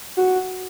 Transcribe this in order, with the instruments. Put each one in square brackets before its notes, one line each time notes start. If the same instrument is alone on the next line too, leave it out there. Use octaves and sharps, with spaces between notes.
[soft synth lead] F#4